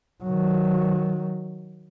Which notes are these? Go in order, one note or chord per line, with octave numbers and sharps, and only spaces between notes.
D#3 F#3